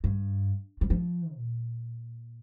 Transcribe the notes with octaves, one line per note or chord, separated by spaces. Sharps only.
G2
G3
F3
A#2